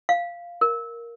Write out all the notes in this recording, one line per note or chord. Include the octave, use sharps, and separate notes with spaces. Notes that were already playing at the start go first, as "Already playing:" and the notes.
F5
A#4